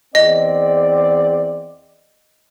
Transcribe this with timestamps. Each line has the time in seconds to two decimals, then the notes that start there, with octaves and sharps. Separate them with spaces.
0.15 E2 C4 D5 D#5